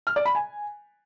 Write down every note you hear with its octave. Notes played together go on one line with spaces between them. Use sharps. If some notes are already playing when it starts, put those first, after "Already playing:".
F6
D5
B5
G#5